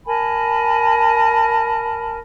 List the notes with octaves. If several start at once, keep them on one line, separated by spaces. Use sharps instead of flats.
A#4 G#5 A5 B5